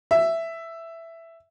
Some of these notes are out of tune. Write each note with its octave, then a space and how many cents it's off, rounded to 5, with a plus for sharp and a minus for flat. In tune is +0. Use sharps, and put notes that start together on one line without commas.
E5 +5